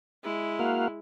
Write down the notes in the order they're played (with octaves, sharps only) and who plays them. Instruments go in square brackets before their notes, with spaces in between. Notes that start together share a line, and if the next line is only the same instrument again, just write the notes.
[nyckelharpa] G#3 E4
[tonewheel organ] A#3 F#4 F5